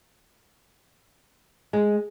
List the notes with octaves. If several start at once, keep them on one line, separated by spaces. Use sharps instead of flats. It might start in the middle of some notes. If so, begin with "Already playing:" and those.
G#3